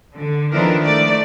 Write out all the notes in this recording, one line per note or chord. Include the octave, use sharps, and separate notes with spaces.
D3
D#3 F3 B3 D4 E4 A#4
A3 D5